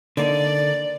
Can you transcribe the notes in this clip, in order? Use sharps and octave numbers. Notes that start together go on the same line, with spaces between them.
D3 A#3 D#4 D5